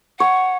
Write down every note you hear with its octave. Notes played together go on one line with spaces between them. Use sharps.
C#5 F#5